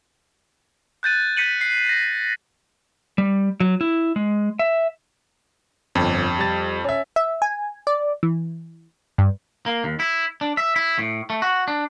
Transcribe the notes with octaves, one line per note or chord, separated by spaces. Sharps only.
F#6 G6 A6 D#7
G6 B6 C#7 D#7 F#7
C7
A#6 D#7
G3
F#3
E4
G#3
E5
G1 F2
G3 A6
C#4 E5
E5
G#5
D5
E3
G2
A#3
D#2
E4
D4
E5
E4
A2
A3
F#4
D4